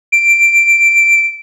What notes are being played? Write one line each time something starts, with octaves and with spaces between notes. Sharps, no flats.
D7